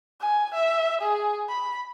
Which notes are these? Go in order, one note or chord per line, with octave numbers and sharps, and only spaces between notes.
G#5
E5
G#4
B5